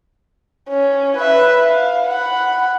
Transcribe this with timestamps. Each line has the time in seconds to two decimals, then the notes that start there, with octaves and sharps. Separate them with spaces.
0.69 C#4
1.17 B4 E5
1.69 F5
2.08 F#5 B5